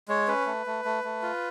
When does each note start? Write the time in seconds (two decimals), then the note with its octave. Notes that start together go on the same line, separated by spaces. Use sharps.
0.08 G#3 C#5
0.28 C#4 B4
0.46 A3
0.66 A3
0.85 A3
1.04 A3
1.22 F4